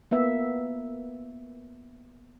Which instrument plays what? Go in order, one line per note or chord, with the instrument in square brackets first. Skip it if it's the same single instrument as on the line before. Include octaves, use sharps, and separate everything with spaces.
[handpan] A#3 B3 E5